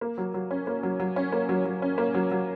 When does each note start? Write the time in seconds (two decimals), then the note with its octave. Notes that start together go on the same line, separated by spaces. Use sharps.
0.01 A#3
0.18 F#3
0.34 F#3
0.51 C#4
0.67 A#3
0.83 F#3
1.00 F#3
1.16 C#4
1.32 A#3
1.49 F#3
1.65 F#3
1.82 C#4
1.98 A#3
2.14 F#3
2.32 F#3